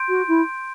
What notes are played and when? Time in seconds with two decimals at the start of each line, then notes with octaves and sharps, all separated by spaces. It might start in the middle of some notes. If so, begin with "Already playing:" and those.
Already playing: C6 G6 D7
0.08 F#4
0.28 E4